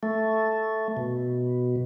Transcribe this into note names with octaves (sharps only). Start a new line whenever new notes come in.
A3
B2